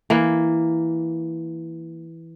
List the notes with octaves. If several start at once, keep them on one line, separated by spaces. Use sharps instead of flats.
E3 A#3